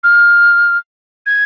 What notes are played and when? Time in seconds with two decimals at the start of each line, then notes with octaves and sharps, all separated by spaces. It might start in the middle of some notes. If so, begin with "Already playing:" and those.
0.03 F6
1.26 G#6